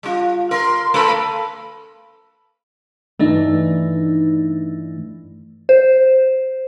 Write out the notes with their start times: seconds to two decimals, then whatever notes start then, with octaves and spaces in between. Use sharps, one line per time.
0.03 G3 F4
0.51 A#4 C6
0.94 A3 A4 B4 B5
3.19 G2 E3 A3 D4 D#4
5.69 C5